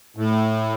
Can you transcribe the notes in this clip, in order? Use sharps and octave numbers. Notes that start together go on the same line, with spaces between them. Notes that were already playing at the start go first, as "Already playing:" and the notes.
A2